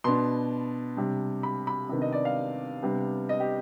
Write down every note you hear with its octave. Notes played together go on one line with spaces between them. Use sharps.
B2 B3 D4 C6
C3 G3 D4
B5
B5
C3 D#3 B3 D4
D#5
D5
F5
C3 G3 B3 D4
D#5
G4